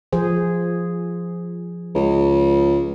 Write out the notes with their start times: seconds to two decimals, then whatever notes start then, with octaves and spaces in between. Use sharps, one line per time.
0.13 F3 G#4 C5
1.95 C#2